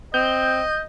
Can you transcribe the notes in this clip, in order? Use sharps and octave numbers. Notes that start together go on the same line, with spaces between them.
C4 D#5 G6